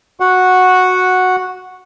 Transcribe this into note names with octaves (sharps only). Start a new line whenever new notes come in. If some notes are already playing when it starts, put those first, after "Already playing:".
F#4 F#5